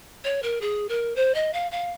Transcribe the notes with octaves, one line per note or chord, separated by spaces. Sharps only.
C#5
A#4
G#4
A#4
C5
D#5
F5
F5